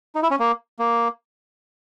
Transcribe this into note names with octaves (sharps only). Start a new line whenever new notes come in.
D#4
E4
C#4
A#3
A#3